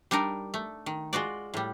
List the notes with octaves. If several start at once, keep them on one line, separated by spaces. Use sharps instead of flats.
G3 D4 D#4 A#4
A3
D#3
G#3 F4 F#4 D5
A2 G3